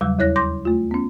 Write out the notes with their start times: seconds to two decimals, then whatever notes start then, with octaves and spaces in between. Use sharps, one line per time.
0.01 E2 C#3 F#3 G3 E6
0.19 D#2 E4 C#5 F#6 A#6
0.36 C6 D6 G6 A#6
0.65 A3 F4
0.91 B3 C#4